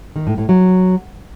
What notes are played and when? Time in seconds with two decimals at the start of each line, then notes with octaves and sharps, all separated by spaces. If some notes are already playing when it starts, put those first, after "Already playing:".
0.16 D#3
0.27 A2
0.38 A2
0.49 F#3